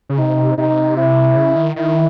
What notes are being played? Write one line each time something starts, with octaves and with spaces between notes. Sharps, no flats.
C#3
C3 D#4
C3 D#4
E4
C#3
D#3
D#3 E4